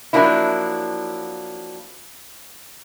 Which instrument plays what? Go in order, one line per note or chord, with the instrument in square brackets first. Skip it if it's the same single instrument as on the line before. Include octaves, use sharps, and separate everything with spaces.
[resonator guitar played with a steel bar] F3 F#3 G#3 A#3 D4 E4